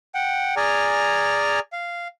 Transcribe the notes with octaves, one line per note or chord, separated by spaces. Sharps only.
F#5 G5
G#4 D5 G#5 A#5 F6
F5